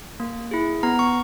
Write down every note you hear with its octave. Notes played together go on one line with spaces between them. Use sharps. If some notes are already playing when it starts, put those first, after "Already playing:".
A#3
E4 G#4
B3 A#5
C#6